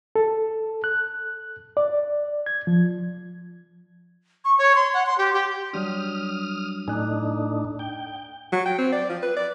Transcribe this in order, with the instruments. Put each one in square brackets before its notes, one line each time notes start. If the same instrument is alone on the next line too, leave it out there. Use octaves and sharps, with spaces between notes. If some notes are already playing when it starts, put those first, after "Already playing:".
[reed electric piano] A4
F#6
D5
G#6
F3
[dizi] C#6
C#5
C6
F#5
C6
G4
G4
[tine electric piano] F#3 G3 D4 [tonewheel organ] D#6 F6
[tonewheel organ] A2 D4 D#4 [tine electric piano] G#5 F#6
[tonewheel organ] G5
[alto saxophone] F#3
G5
C4
D5
F3
B4
D5